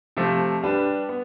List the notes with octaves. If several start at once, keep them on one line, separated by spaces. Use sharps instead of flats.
C3 F3 A3
G3 D4 G4 B4
B3